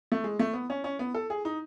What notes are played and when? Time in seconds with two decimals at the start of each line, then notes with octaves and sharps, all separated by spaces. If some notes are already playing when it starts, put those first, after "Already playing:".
0.12 A3
0.24 G#3
0.39 A3
0.53 B3
0.70 C#4
0.84 C#4
0.99 B3
1.14 A4
1.30 G#4
1.45 D#4